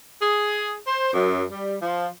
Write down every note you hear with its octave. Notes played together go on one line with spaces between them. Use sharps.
G#4
C5
F#2
G3
F3